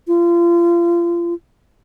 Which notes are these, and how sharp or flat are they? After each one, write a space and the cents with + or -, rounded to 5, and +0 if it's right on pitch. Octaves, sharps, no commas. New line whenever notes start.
F4 -30